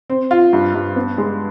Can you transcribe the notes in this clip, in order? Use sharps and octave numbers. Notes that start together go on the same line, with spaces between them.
C4
F4
G2
G2
B3
G#3